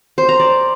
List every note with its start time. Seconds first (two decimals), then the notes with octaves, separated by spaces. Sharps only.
0.18 C5
0.29 A#5
0.40 D5